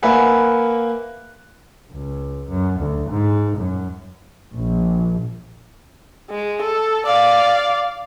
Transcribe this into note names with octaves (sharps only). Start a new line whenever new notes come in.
A#3 A#4 B4 E5 F#5 G#5
C#2
F#2
D2
G#2
F#2
A#1
G#3
A4
D5 F5